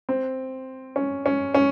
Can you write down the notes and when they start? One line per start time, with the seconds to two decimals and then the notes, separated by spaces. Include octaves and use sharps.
0.09 C4
0.96 C#4
1.26 C#4
1.55 C#4